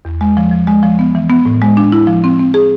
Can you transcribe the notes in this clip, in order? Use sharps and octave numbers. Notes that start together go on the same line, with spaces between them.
E2
G#3
F3
F3
G#3
F3
B3
E3
B3
A2
G#3
D4
E4
F3
C4
C4
G#4